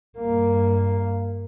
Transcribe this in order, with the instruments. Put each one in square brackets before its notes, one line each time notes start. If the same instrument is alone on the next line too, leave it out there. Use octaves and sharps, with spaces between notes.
[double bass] G2 A#3